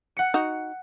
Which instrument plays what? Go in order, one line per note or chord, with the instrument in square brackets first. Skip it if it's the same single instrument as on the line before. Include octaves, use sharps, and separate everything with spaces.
[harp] F#5 C#7
[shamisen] D#4 F#4